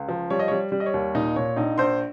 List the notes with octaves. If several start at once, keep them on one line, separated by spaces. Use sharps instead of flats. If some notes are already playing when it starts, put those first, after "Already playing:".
Already playing: C#2
F3
G3 C#5
D#5
G3 C#5
G3
D#5
C#5
D#2
A#2 D#4 D#5
A#2 C#5
A#1 D#4 D#5
A#1 C5 C6